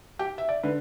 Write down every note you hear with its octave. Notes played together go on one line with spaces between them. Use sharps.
G4
E5
D5
D3 B4